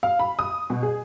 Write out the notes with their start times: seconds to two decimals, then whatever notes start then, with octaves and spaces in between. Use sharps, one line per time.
0.03 F5
0.19 B5
0.39 D#6
0.70 B2
0.83 G#4